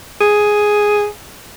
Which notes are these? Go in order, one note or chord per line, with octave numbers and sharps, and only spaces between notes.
G#4